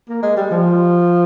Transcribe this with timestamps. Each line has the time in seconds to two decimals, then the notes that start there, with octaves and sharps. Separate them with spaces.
0.09 A#3
0.22 G#3
0.36 G3
0.51 F3